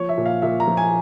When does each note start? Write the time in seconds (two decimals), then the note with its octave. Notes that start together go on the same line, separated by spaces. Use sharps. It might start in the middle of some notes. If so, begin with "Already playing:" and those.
Already playing: F3 C#5
0.09 E5
0.17 A#2
0.26 F5
0.42 A#2 E5
0.60 A#5
0.68 F3
0.77 G#5